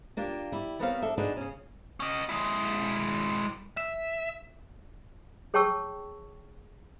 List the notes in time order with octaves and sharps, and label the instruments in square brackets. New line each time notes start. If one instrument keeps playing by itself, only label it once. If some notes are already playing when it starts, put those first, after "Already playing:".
[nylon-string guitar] A#3 D4 F4 G4
G3 E4
G3 B3 C4 A#4 C#5 F5
D4 A4 E5
D4 D#4 F#4 G#4 B4 D5
C#3 C#4
[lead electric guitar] C#4 D#5
G#3 E4
E5
[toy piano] G#4 C#5 G5 A5 C#6 E6